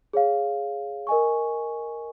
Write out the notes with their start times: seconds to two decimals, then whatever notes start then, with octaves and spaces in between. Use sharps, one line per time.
0.13 G#4 C#5 F5
1.07 A#4 D#5 G#5 C#6